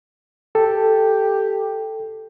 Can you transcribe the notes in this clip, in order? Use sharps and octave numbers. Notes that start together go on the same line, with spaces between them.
G4 A4